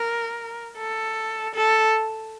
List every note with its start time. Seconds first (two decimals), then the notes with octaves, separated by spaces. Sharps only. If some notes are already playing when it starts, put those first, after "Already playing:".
Already playing: A#4
0.78 A4
1.54 A4